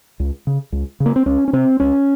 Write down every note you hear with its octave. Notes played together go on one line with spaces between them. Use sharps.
C#2
C#3
C#2
C#3
A#3
C4
C#2 C#4
C#4
C3 C4
C#2 C#4